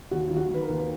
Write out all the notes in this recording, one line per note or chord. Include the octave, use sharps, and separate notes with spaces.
D#2 F#4
D#3 F4
F#4
D#3 B4
A#4
D#2